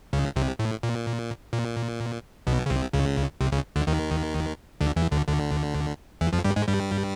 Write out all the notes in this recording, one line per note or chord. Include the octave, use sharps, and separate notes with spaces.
C#2 C#3
C2 C3
A2
A#2
A#2
B1 B2
C#3
C2 C3
C#2 C#3
C2 C3
C#2 C#3
D2 D3
D#2 D#3
D2 D3
E2 E3
D2 D3
D2 D3
E2 E3
F2 F3
G2 G3
G#2 G#3
G2 G3